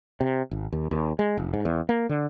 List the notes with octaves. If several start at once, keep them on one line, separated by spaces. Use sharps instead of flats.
C3
G#1
D#2
D#2
G#3
F1
G#2
E2
A#3
D3